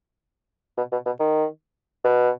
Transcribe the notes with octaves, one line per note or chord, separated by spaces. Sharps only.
B2
B2
B2
D#3
B2